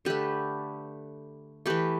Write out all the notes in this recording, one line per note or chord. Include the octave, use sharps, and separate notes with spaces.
D3 A3 G4 B4
E3 A3 G4 B4